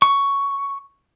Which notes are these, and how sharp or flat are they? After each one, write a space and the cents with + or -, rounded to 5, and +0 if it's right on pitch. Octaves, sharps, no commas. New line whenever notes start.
C#6 +5